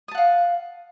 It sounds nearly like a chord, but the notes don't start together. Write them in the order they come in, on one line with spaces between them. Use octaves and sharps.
D#6 A5 F#5 F5